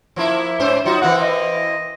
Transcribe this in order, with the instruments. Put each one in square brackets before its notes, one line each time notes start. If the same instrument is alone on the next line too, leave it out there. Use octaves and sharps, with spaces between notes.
[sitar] F3 A#3 E4
G#2 C#4 C5
[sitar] F#3 D#4 F#4 [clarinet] F4
[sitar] E3 A#3 C4 [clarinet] F#5
[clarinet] D#5